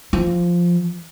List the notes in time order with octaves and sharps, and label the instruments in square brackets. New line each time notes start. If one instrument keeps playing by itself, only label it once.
[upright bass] F3